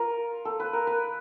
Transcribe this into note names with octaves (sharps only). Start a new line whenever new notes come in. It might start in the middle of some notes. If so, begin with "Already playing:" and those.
Already playing: F4 A#4
A4
B4
A#4
B4